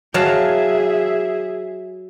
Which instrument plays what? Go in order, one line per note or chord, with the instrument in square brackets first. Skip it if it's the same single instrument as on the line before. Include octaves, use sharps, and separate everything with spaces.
[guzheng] F#3 F5 A5 [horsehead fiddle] G#4 E5